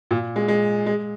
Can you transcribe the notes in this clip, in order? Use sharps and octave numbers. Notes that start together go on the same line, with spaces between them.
A#2
G#3
G#3
G#3